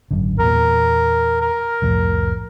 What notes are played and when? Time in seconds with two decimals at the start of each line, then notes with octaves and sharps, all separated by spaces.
0.11 G#1 F#2 D3
0.39 E2 A#2 A#4
1.41 A#4
1.82 C2 F2 A2